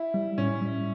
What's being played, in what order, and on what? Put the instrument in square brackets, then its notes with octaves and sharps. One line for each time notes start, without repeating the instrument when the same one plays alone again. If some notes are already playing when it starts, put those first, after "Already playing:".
Already playing: [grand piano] E4
[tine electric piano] G3
[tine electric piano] A2 [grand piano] C#4
[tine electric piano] G3